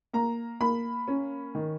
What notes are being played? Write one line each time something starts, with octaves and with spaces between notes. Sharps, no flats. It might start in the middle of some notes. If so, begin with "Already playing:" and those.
A#3 A#5
A#3 B5
C#4
D#3